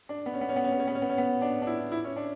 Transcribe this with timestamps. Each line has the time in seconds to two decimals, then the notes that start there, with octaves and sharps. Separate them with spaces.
0.09 D4
0.26 B3
0.34 C#4
0.41 B3
0.49 C#4
0.56 B3
0.64 C#4
0.72 B3
0.80 C#4
0.88 B3
0.95 C#4
1.02 B3
1.10 C#4
1.18 B3
1.42 D4
1.62 D4
1.67 E4
1.92 E4
2.04 C#4
2.16 D4